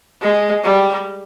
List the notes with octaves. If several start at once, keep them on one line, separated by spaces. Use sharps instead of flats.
G#3
G3